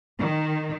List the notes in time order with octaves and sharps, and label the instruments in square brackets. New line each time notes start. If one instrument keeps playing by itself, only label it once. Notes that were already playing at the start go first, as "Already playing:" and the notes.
[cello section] D#3